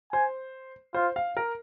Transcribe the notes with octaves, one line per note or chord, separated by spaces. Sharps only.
C5 G#5
F4 C5
F5
A#4